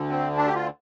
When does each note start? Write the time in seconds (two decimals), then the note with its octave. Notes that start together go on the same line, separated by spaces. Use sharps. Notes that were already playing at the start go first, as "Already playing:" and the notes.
Already playing: D2 D3
0.09 C4
0.36 D4
0.47 G4
0.55 F4